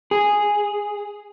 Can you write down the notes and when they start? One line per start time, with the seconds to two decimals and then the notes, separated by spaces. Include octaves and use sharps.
0.11 G#4